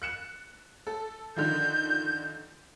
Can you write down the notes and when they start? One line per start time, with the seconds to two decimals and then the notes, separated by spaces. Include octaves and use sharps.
0.02 F#6 C#7 E7
0.87 A4
1.36 D3 D#3 F3 G6